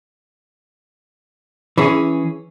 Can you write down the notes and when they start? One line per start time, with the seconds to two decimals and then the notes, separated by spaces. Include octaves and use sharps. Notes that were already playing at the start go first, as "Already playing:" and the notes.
1.78 E3 C#4 G#4